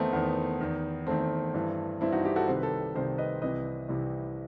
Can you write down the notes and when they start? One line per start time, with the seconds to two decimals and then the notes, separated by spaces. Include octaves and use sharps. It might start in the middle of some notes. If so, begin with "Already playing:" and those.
Already playing: E2 D#3 A3 B3 C4 D#4
0.13 E2 D#3 B3
0.61 E2 D#3
1.06 E2 D#3 A3 C4
1.54 G2 E3
2.01 G2 E3 C4 E4
2.12 D#4 F#4
2.25 E4 G4
2.36 F#4 A4
2.48 C2 C3 D#3 C5
2.56 B4
2.63 A4 C5
2.95 C2 C3 D#3 A4 C5
3.18 B4 D#5
3.42 C2 C3 E3 B4 D#5
3.89 C2 C3 E3